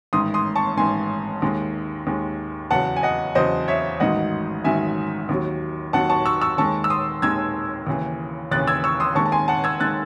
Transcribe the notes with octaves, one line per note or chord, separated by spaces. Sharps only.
A1 G#2 D#3 C6 D#6
C6 D#6
A5 C#6
A1 G#2 D#3 G#5 C6
D#2 D#3 G#3
D#2 D#3 G#3
E2 C#3 F#3 F#5 A5
G#5
D#5 F#5
E2 C#3 F#3 C5 D#5
C#5 E5
A1 G#2 D#3 F#3 D#5 F#5
A1 G#2 D#3 F#3 E5 G#5
D#2 D#3 F#3
D#2 D#3 F#3 F#5 A5
A5 C#6
C#6 E6
C#6 E6
D#2 D#3 G#3 A5 C#6
E6
C6 D#6
D#2 D#3 G#3 E6 G#6
D#2 C#3 E3
D#2 C#3 E3 F#6 A6
E6 G#6
C#6 E6
C6 D#6
D#2 D#3 G#3 A5 C#6
A5
G#5 C6
F#5 A5
E6 G#6
D#3 G#3 F#6 A6